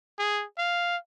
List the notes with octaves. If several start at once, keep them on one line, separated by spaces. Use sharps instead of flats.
G#4
F5